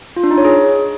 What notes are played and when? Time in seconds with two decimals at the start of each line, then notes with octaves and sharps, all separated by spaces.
0.16 F4
0.24 D4
0.31 D#4
0.38 C#5
0.45 G#4